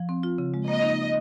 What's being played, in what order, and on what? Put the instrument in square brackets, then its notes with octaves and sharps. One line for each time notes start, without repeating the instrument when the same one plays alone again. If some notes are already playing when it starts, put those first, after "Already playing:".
Already playing: [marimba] F3
C4
F4
C#3
G#3
[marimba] A#3 [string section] D#5
[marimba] D#4